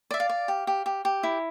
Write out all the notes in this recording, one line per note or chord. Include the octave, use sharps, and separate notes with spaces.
D5 E5
F5
D5
G4
G4
G4
G4
E4